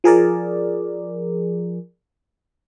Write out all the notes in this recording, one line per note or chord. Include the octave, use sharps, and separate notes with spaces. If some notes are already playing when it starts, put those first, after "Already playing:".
F3 G#4 A#4 D5